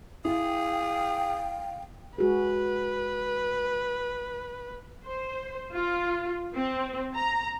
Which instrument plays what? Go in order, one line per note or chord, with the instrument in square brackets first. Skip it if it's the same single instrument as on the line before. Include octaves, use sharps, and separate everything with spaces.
[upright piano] E4 [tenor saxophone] G#4 [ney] F5 [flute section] G5
[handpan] G#3 F#4 G#4 [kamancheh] B4
[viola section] C5
F4
C4
A#5